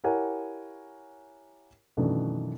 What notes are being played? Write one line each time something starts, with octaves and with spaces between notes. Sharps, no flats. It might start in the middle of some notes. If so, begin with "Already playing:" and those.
E4 G4 A#4 C#5 F#5 G#5
F#2 B2 D#3 E3 A3 D4